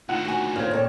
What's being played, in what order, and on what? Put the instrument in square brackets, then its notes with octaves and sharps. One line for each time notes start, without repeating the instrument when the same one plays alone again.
[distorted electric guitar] D2 D#3 [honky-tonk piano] F4 F#5
[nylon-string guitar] F#4 G#5
[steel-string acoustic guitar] A#2 C4 [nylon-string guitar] C#4 F4 [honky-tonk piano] F6 G#6
[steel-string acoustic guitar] D#2 A4 C#5 [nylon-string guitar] A#2 C4